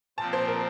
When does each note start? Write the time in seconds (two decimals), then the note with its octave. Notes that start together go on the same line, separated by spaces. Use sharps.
0.18 A#2 F3 C4 A5
0.33 C5
0.48 A#4